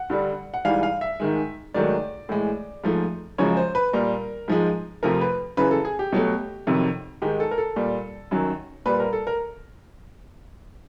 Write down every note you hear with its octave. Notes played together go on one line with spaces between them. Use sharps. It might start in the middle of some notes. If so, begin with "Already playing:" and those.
Already playing: F#5
G2 D3 G3
F#5
G#2 E3 G3 F5
F5
E5
G#2 D#3 G#3
G#2 D#3 F#3 A3 D5
A2 E3 G#3
G#2 F3 A3
F#2 C#3 F3 G#3 C#5
C5
B4
A#2 G3 A#4
G#2 F3 G#3
F2 C3 F3 A3 A#4
B4
F#2 C#3 E3 B4
A4
G#4
G4
B2 F#3 A3
F2 C3 D#3 F#3
G#2 D#3 G#3 G4
A4
A#4
A4
A#2 G3
F#2 D#3 F#3
A#2 G3 B4
A#4
A4
A#4